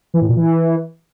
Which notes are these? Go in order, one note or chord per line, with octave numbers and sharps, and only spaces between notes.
E3
A2
A#2
E3